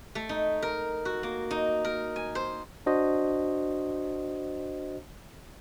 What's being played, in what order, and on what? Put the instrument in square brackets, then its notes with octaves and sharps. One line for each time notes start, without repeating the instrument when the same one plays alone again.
[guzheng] A3
D#4
A#4
F#4
A#3
D#4
A#4
G#5
C5
[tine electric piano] D4 F#4 C5 D#5